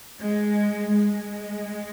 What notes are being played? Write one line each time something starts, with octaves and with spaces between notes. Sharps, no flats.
G#3
G#3